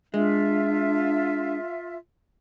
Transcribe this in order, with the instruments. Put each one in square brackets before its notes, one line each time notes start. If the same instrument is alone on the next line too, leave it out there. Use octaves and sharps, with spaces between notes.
[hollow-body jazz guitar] G#3 [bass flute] D4 [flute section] F4 E5